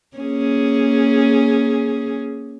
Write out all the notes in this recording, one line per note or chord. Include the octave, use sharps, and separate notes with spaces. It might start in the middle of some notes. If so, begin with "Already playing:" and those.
A#3 C#4 G#4